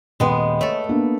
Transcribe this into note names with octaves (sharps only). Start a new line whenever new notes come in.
D#1 G#3 B3 G5 B5
A3 A4 C#5
A#3 B3 D4